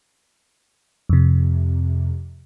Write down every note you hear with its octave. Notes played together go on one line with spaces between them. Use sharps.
F2 C3